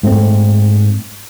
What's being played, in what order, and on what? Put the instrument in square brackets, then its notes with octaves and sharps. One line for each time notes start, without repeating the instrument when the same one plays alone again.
[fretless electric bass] G#2 A3 A#3 C4